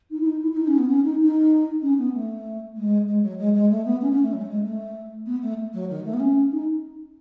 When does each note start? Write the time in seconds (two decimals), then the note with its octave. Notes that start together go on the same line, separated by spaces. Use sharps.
0.10 D#4
0.20 E4
0.26 D#4
0.41 E4
0.52 E4
0.56 D#4
0.67 C#4
0.78 B3
0.89 C#4
1.04 D#4
1.20 D#4
1.82 C#4
1.98 B3
2.14 A3
2.76 G#3
3.07 G#3
3.23 F#3
3.38 G#3
3.54 G#3
3.70 A3
3.85 B3
4.01 C#4
4.12 C#4
4.22 A3
4.33 F#3
4.41 A3
4.48 G#3
4.63 A3
5.26 B3
5.42 A3
5.73 F#3
5.89 D#3
6.05 A3
6.13 B3
6.19 C#4
6.52 D#4